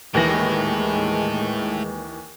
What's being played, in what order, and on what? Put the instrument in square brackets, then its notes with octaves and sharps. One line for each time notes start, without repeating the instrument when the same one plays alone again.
[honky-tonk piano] D#2 E3 A#6 [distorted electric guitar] A2 [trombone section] D#3 G#3